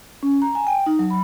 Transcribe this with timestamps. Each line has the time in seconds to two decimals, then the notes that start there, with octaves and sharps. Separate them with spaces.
0.23 C#4
0.42 A#5
0.55 G#5
0.67 G5
0.86 D#4
0.99 F#3
1.10 B5